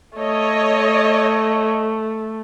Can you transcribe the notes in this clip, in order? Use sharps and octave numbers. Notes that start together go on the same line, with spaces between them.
A3 C#5 D#5